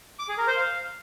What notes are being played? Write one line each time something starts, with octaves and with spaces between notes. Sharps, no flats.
D6
G#4
A#4
C5
F5